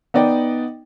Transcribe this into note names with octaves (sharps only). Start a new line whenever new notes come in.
B3 D#4 D5 D#5 G5